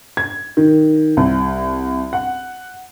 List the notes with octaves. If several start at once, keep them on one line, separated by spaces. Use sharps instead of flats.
G#6
D#3
C2
F#5